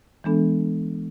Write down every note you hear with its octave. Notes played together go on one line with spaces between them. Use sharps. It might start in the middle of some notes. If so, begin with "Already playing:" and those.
E3 G#3 B3 D4 A4